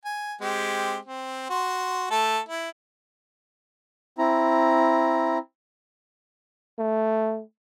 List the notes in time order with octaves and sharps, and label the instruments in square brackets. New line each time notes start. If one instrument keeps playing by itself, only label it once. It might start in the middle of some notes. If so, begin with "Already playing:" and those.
[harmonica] G#5
G#3 C4 G4
C4
F#4 C6
A3 A4
E4
[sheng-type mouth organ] C4 E4 A#5
[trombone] A3